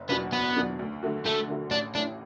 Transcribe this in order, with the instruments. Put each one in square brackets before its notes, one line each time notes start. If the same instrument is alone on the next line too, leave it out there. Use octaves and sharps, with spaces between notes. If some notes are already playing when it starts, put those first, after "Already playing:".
Already playing: [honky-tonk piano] F#1
[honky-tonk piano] E2 B2 F#3 D4 [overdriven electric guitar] B3
[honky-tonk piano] F#1 [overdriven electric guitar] B3
[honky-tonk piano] E2 B2 F#3 D4
D2
D3 A3 F#4
[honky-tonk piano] D2 [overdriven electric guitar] A3
[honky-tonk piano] D3 A3 F#4
[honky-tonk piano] A1 [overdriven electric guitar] D4
[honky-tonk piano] A2 E3 [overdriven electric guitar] D4